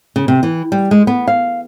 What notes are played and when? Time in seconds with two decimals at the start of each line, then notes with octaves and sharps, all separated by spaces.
0.16 C#3
0.28 C3
0.43 E3
0.72 G3
0.91 G#3
1.07 B3
1.28 F5